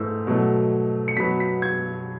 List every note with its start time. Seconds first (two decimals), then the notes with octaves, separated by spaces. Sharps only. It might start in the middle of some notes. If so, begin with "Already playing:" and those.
Already playing: G#2 E3 A3 E6
0.27 B2 F#3 A3
1.08 C#7
1.17 B2 F#3 B3 B6
1.40 B6
1.62 G#6